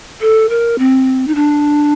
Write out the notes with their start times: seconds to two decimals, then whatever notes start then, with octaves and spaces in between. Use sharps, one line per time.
0.21 A4
0.49 A#4
0.78 C4
1.27 D#4
1.35 D4